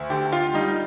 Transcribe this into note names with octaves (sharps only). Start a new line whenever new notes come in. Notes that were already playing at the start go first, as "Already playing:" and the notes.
Already playing: D2
D3 G4
F4
G3 D#4